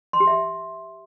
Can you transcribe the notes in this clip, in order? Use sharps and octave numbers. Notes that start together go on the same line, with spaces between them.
C6
G4
E5